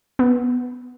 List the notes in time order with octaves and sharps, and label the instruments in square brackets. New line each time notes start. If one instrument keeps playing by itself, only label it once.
[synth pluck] B3